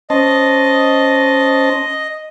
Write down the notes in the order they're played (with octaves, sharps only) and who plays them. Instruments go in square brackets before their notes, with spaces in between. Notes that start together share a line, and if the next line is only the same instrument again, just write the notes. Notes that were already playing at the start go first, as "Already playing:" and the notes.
[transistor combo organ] C#4 C5 A5 [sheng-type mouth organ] D#5